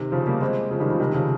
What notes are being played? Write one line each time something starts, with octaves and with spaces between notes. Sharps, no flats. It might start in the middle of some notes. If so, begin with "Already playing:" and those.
Already playing: C3 D#3
C#3 F3
G3 A#3
G#3 C4
C#3 F3
D#3 G3
C#3 F3
C3 D#3
C#3 F3